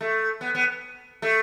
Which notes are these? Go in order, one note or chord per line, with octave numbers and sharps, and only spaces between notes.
A3
B3
B3
A3